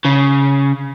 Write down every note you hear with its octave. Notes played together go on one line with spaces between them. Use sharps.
C#3